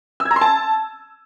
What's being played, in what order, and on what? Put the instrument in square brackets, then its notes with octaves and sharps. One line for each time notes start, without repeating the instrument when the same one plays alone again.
[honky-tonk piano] E6
G#6
A#5
C6
A5